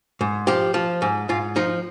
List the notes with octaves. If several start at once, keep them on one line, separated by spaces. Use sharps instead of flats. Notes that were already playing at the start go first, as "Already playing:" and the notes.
G#2
F3 G4
F3
G#2
G#2 F4
F3 D#4